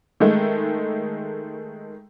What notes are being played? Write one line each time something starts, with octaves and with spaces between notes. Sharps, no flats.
D#3 G#3 A3